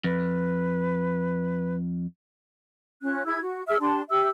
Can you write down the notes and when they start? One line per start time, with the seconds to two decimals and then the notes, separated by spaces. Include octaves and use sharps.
0.04 F2 B4
3.02 C#4 F4 F#6
3.26 E4 G#4 E6 G#6
3.41 F#4
3.68 G#4 E5 E6 F6
3.81 D4 G4 A5 C6
4.09 G4 E5 E6